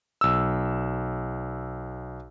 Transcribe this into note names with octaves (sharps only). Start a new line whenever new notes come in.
B1 E6